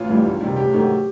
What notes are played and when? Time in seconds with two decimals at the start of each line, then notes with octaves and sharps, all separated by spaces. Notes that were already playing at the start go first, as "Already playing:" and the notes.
Already playing: A1 F4
0.09 G2 E3 G3
0.25 C#2
0.41 C3 D#3 G3
0.56 A1 G4
0.73 G#2 D#3 F#3 A3